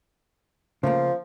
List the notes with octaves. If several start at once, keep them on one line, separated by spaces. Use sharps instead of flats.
C#3 F3 A3 A#3